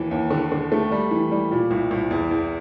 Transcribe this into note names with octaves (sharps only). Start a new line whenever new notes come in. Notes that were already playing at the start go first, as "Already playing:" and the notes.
Already playing: D#2 E3
D#2
D3
D3
A3
G3
E3
G3
A#2
C2
C2
E2
E2